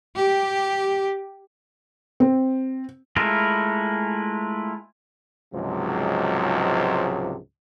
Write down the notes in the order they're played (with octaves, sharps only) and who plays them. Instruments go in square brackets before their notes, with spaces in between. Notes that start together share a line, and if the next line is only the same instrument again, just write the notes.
[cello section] G4
[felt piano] C4
[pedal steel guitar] G#3 A3 E4 F4 A#4
[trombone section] C#2 G#2 C3 F3 F#3